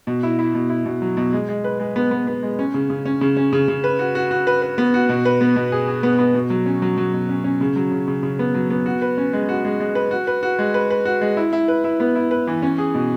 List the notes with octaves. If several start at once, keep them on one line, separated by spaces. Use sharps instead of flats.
B2
E4
E4
B2
E4
B2
F#3
B2
G#3
G#3
B4
G#3
B3
B3
B3
G#3
C#4
C#3
C#3
C#4
C#3
C#4
C#3
C#3
B4
F#4
F#4
F#4
B4
B4
B3
F#4
B2
B4
B3
B2
G#4
G#4
B3
B3
B2
F#3
C#4
F#3
F#3
B2
C#4
C#4
C#3
F#3
C#3
C#3
C#3
B3
F#3
B3
F#4
B4
C#4
G#3
F#4
G#3
G#3
B4
F#4
B4
F#4
G#3
B4
B4
F#4
G#3
E4
E4
B4
E4
B3
E4
B4
E3
C#4
G#4
B2